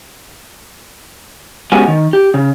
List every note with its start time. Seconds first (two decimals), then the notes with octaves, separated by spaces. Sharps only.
1.72 G#3 B3 C#4 F#4 G4 G#5
1.88 D#3
2.13 G4
2.34 C#3